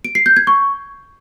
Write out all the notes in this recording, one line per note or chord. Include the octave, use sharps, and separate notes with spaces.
D7
C7
G6
G#6
C#6